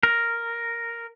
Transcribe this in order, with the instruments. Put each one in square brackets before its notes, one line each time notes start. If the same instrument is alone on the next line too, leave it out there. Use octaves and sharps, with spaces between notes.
[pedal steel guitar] A#4